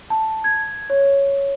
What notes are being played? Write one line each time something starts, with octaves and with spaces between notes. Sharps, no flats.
A5
G#6
C#5